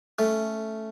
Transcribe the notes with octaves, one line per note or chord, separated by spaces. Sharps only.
A3 C#4